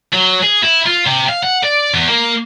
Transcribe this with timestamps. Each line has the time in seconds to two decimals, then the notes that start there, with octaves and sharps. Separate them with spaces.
0.13 F#3
0.43 G#4
0.63 E4
0.86 F4
1.06 C3
1.29 F5
1.43 F#5
1.64 D5
1.94 E2
2.08 A#3